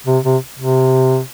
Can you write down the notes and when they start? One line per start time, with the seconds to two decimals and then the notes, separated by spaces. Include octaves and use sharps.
0.06 C3
0.25 C3
0.59 C3